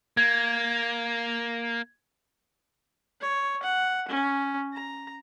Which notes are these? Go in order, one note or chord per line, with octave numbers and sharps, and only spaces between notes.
A#3 G#6
C#5
F#5
C#4
A#5